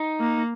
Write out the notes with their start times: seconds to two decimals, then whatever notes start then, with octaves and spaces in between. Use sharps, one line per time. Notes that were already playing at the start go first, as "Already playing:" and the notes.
Already playing: D#4
0.20 A#3